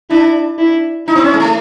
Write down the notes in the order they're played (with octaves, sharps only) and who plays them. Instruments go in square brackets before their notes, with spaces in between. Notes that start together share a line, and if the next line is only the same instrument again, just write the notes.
[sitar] D4 [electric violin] E4
[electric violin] E4
[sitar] D#4 [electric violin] E4
[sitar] C4
C#4
G#3
A3